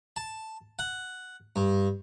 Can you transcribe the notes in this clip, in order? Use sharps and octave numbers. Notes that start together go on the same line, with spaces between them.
A5
F#5
G2